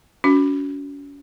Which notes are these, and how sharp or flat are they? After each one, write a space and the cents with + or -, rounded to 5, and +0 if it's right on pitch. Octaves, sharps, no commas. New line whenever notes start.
C#4 +35 F#4 +0